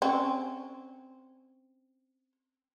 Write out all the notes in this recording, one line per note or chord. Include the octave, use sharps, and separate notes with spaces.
C4 C#4